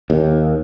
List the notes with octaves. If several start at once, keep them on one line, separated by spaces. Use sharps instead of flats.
D#2